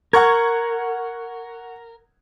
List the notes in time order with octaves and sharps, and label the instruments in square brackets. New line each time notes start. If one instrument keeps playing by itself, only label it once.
[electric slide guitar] A#4 [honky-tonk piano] F#5 C#6 G#6